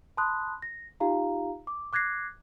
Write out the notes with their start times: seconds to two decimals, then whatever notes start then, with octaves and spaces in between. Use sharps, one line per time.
0.17 A5 B5 C6 D#6 F#6
0.62 A#6
1.00 D#4 F4 G4 F5 A#5
1.67 D6
1.93 D6 F#6 G#6 A#6 C7